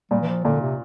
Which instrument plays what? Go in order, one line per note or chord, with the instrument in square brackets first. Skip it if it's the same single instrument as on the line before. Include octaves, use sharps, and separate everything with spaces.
[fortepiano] A#2 [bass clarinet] G3
[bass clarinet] E3
F3
[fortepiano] A#2 [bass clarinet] D3
[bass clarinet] C3